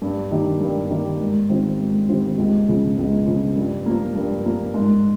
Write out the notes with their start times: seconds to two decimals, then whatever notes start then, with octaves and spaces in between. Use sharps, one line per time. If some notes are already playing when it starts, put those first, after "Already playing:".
0.02 G2
0.31 D#3 A#3 D#4 G4
0.60 G2
0.90 D#3 A#3 D#4 G4
1.20 G#2
1.49 D#3 G3 C4 F4
1.79 G#2
2.08 D#3 G3 C4 F4
2.38 C#2
2.68 C#3 F3
2.97 C#2
3.26 C#3 F3
3.56 G2
3.86 F3 A#3
4.15 G2
4.45 F3 A#3
4.74 G#2